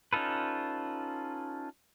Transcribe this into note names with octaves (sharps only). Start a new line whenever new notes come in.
C#4 D#4 F4 A4 B4